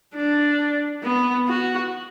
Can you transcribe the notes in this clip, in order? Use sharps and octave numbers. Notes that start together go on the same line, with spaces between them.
D4
B3
F#4